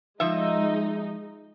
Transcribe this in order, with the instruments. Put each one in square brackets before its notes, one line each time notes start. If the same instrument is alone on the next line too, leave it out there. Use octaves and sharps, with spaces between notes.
[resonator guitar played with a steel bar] F3 E5 [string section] G#3 D#4